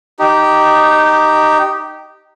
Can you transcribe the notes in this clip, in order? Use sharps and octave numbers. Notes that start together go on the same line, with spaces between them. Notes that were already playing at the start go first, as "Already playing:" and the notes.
D#4 G4